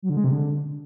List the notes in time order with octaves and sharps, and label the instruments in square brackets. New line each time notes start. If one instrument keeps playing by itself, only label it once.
[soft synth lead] F#3
D3
G#3
C3
D3